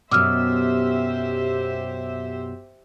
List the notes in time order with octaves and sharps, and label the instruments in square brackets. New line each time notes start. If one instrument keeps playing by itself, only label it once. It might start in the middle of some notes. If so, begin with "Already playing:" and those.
[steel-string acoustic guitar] F#2 B2 [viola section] G4 C5 E5 [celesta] D6 E6 F6